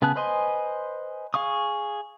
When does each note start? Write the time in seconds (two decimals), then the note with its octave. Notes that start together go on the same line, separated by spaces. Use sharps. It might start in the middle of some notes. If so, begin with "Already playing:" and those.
0.02 C#3 B3 G#4 A5 F#6
0.16 B4 C5 D#5 G#5 C6
1.34 G#4 F5 C#6 D#6